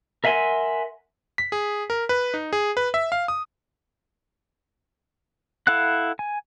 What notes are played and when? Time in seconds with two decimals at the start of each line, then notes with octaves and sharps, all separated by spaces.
0.24 A#4 E5 F#5 G#5 C6
1.38 B6
1.52 G#4
1.90 A#4
2.09 B4
2.34 D#4
2.53 G#4
2.77 B4
2.94 E5
3.12 F5
3.28 D#6
5.67 E4 A4 F5 F#5 F#6
6.19 G#5